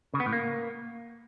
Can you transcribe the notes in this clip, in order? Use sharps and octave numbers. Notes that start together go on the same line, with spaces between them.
C#3
B3
A2
A#3